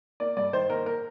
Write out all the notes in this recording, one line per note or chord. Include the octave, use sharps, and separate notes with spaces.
A#3 D5
G2 D5
D#3 C5
A#3 A#4
A#4